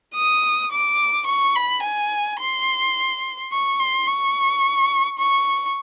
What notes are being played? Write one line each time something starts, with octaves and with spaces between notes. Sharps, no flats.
D#6
D6
C#6
B5
G#5
C6
C#6
C6
C#6
C#6